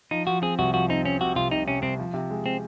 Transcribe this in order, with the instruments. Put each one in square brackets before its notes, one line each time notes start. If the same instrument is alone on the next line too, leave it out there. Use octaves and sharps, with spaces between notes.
[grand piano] F3 [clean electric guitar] D#4
[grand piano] F3 [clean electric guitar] F#4
[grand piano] C4 [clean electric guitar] G#4
[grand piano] C2 [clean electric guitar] F#4
[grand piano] F3 [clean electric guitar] F#4
[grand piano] C4 [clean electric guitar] D#4
[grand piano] C4 [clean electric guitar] C#4
[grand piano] C3 [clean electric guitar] F#4
[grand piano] C2 [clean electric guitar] F4
[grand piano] C3 [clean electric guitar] D#4
[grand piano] C3 [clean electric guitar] C#4
[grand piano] C2 [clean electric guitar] C4
[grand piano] F3
C3
G#3
[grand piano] G#3 [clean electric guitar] C4